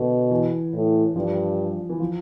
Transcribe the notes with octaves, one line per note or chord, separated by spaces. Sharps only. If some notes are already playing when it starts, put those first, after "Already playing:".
Already playing: B2 D3
E3
A2
G2 F3
E3
F3